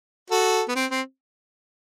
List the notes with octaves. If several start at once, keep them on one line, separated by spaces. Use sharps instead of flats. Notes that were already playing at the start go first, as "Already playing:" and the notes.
F#4 A4
B3
C4
C4